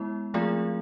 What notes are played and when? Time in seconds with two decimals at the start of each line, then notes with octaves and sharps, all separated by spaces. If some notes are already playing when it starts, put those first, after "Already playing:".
Already playing: G#3 B3 E4
0.34 F3 A3 C4 F4 G#4